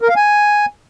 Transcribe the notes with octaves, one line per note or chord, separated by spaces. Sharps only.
A#4
F5
G#5